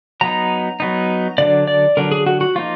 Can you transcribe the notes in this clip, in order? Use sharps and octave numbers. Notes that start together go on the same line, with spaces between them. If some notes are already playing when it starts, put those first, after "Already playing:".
F#3 B3 D#4 A#5
F#3 B3 D#4
D3 F#3 D4 D5
D5
D3 F#3 D4 A#4
G#4
F#4
F#4
F3 A#3 D#4 F4